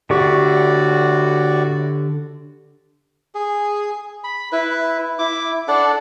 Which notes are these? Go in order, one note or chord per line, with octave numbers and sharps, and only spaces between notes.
A2 D3 F#4 G4 D5 C#6
G#4
B5
E4 B4
E4 D6
D4 A4 D5 F#5